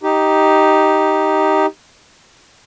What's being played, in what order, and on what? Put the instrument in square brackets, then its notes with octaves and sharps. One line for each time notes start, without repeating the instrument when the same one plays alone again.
[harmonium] D#4 G4